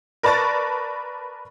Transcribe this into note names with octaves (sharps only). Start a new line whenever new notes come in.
A#4 B4 D5 A5 C#6 A6